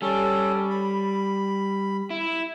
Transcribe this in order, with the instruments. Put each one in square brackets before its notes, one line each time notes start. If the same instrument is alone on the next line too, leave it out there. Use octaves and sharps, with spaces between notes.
[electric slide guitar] G3 [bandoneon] C#4 A4
[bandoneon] B5
[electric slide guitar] E4